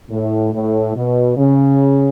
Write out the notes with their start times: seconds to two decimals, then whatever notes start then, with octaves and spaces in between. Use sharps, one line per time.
0.10 A2
0.53 A2
0.95 B2
1.37 C#3